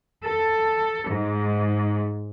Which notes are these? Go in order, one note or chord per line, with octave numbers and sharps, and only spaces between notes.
A4
G#2